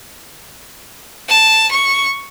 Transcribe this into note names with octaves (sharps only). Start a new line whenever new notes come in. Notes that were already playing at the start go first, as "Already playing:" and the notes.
A5
C#6